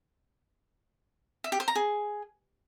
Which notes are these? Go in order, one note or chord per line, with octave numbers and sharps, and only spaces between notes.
E5
G4
C5
A#5
G#4